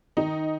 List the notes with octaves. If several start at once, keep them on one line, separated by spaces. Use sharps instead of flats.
D#3 D#4